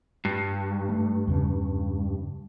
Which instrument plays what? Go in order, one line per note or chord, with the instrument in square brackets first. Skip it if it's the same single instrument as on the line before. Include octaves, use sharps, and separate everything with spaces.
[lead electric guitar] G2
[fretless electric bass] A3
E2 C#3